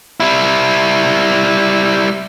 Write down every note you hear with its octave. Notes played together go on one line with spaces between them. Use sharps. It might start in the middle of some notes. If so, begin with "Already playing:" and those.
G3 E4